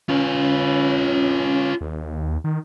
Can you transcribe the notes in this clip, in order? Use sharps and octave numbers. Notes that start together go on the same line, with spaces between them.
C#4 F4 B4
D#2
D#3